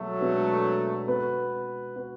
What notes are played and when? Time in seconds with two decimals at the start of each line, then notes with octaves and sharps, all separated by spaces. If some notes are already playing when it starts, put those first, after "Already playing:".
Already playing: B2 F#3 G#3 A3 D4 F#4
0.20 B2 G#3 D4 F#4 B4
1.08 B3 F#4 B4
1.96 B3 F#4 B4